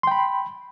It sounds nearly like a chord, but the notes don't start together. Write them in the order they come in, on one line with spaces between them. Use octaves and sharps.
C6 G5 B5